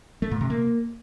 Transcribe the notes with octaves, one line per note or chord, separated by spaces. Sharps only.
A3
A#2
C3
A#3